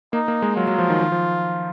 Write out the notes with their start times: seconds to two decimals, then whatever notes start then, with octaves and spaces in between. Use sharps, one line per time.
0.13 A#3 D#4
0.28 A#3
0.42 G#3
0.56 F#3 F4
0.67 F#3
0.79 F3
0.90 D#3
1.01 D#3
1.12 F3